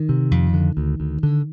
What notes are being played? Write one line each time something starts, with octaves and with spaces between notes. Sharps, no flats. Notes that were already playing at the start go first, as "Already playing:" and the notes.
Already playing: D#3
C3
F2
D3
D2
D2
D3